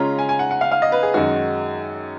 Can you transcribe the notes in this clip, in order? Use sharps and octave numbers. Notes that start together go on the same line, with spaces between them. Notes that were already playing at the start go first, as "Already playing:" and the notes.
Already playing: C#3 G#3 C#4 F4 A#5
G#5
G#5
F#5
F#5
F5
F5
D#5
B4
G#4
F#2 D#3 G#3 D#4 F#4